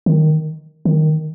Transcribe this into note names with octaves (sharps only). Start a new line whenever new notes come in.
D#3
D#3